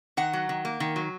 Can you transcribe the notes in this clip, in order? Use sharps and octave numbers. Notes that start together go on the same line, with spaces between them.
D#3 F#5
F#3
D#3
A#3
D#3
F#3